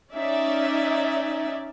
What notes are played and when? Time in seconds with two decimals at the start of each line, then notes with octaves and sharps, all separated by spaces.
0.13 C#4 D#4 D5 E5